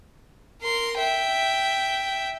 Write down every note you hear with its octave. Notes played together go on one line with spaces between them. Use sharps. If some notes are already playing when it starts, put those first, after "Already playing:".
A#4 C6
E5 G5